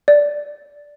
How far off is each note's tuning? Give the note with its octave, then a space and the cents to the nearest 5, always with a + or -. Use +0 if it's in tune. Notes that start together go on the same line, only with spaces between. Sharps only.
D5 -5